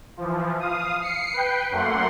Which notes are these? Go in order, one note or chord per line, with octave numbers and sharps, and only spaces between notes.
E3 F3
F5 D#6
C7 C#7
B4 G5
F#2 A3 A#3 F#5 C6